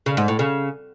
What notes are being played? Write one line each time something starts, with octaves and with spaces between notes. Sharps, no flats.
C#3
G#2
A2
C#3